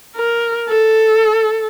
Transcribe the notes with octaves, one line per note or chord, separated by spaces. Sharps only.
A#4
A4